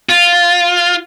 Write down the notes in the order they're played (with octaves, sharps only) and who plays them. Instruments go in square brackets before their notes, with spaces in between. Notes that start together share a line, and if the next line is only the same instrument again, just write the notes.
[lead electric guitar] F4